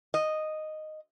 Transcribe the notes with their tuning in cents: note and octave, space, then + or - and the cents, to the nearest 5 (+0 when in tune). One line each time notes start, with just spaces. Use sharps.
D#5 -5